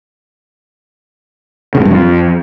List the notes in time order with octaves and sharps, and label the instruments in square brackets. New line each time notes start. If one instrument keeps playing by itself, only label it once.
[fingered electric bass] C#3
A2
G2
F2